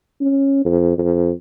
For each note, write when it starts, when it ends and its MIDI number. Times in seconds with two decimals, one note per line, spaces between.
0.21 0.61 61
0.65 0.97 41
0.98 1.30 41